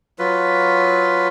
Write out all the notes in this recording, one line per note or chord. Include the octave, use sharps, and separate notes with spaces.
F#3 F4 B4